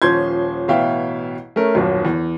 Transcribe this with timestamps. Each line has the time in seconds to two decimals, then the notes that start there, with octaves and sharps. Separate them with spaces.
0.02 D#1 F3 C#4 C6 G6 G#6
0.68 A1 B2 E5 F5 G5
1.56 A3 C#4 A#4
1.75 D#1 B1 F#2
2.05 E2